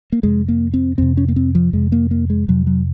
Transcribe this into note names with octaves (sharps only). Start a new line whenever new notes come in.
A#3
F2 C3 G#3
A#3
C4
F2 C3 C4
C#4
A#3
C4
F3
F2 C3 G#3
A#3
A#3
G#3
F2 C3 F#3
F#3